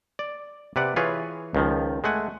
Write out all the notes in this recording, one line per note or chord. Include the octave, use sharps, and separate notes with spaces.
D5
C3 B4 D5 F#5
E3 F4 G#4 B4 C#5
C#2 D#3 F3
G#3 A3 F#5 G#5